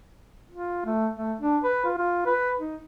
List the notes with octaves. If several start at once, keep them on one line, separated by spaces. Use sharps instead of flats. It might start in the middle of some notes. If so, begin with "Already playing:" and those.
F4
A3
A3
D4
B4
F4
F4
B4
D#4